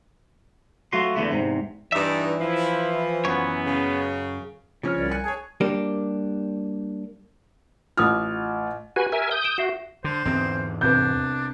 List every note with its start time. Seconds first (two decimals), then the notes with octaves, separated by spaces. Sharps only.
0.93 F#3 A3 F4 F#4 C6
1.15 E2 D3 A3 B3
1.32 E2 G#2 C3
1.92 G2 E3 D#4 D5 E5
2.40 F3 E4
3.25 F#2 B3 C#5
3.65 C#3
4.83 C#3 F3 C#4 C#5 F6
4.96 C2 D5
5.11 G#5 F#6 C#7
5.24 G#4 C#5 A5
5.61 G3 A#3 D4 G4
7.97 A1 F4 D#6 F6
8.96 F#4 G4 B4 G#5
9.12 A#4 E5 G#5
9.31 D#6 G6
9.44 D7 E7
9.58 F#4 E5 C7 E7
10.04 D3 C5
10.25 E2 G#2 D3 C4
10.81 C2 C3 B3 D4 G6